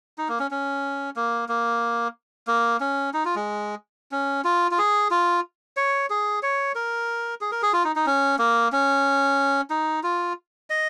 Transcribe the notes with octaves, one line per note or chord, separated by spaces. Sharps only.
D#4
A#3
C#4
C#4
A#3
A#3
A#3
C#4
D#4
F4
G#3
C#4
F4
F4
G#4
F4
C#5
G#4
C#5
A#4
G#4
A#4
G#4
F4
D#4
D#4
C#4
A#3
C#4
D#4
F4
D#5